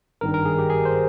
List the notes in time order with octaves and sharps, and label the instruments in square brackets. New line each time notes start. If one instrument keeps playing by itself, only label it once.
[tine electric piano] G#1 G2 D#3 A#4
A#4
G#4
G4
G#4
C5